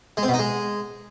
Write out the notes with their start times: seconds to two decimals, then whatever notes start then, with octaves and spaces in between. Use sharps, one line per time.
0.17 G#3
0.23 C4
0.28 B2
0.34 D#4
0.39 G#3